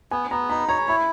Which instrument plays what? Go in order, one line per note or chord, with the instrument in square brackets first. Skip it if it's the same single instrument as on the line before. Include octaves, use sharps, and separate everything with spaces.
[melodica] B3 [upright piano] G#5
[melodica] B3 [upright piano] A#5
[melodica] D#4 [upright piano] B5
[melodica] C#5 [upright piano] A#5
[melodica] E4 [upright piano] B5